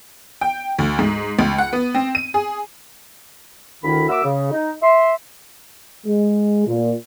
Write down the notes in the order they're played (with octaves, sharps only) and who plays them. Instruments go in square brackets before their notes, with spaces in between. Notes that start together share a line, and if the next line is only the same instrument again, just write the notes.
[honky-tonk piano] G5
D2
G#2
C#2
F#5
B3
C4
D#7
G#4
[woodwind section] D2 D#3 E4 B5
A#3 F#4 E5 D6 E6
C#3
D#4
E5 C6
[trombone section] G#3
A#2